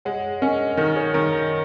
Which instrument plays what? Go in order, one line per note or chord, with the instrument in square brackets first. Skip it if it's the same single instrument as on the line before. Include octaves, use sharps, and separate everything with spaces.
[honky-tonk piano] G#3 [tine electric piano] C#5 F#5
[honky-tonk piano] C#4 [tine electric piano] A#4 D#5
[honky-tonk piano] D#3 [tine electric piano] A#4
[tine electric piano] G#4 C#5
[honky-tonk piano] D#3 [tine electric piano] A#4
[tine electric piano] A#4